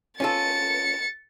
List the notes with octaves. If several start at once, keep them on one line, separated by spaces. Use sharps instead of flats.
C#4 F4 A4 A6 C#7